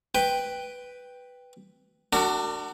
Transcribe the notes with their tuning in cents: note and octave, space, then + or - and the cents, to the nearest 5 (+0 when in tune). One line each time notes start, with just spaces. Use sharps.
B4 +0 G5 +5
D4 +15 F#4 +20 A#4 -40